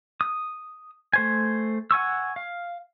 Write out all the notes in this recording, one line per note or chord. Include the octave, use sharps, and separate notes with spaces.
D#6
A3 C5 G#5
F#5 G#5 C#6 E6
F5